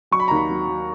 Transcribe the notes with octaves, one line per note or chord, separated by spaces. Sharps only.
F#3 C#6
B5
D#2 A#5
B5
F#3
F#3